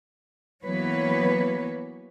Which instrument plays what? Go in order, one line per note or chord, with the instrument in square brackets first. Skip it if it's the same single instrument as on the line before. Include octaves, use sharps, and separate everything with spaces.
[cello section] E3 F#3 A#3 B3 B4 C#5